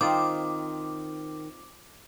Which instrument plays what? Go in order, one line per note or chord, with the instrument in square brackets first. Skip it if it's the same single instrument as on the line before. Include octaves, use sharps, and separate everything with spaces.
[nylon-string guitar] D#3 [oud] C4 [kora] D#4 F4 [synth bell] D6